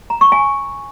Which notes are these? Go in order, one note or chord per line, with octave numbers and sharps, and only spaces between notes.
A#5
C#6
G#5